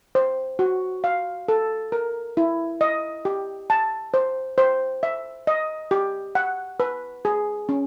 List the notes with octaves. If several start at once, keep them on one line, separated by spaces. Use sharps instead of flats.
C5
F#4
F5
A4
A#4
E4
D#5
G4
A5
C5
C5
E5
D#5
G4
F#5
B4
G#4
C#4